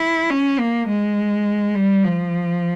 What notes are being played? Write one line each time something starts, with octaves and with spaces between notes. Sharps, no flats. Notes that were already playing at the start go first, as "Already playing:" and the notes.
Already playing: E4
C#4
A#3
G#3
G3
F3